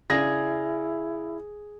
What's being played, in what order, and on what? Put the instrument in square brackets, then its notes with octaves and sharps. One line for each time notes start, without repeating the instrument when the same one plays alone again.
[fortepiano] C#3 D4 [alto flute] E4 [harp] G#4 [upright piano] A#6